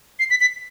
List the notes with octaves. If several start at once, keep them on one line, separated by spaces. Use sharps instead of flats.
C7
B6
B6